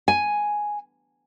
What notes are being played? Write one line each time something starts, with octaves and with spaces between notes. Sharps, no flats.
G#5